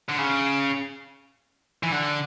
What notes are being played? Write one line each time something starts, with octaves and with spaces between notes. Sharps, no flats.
D3
C#3
E3
D3